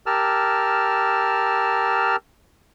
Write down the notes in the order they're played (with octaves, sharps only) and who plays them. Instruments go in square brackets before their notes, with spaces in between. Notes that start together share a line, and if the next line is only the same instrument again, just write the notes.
[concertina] G4 A#4 A5 E6 F6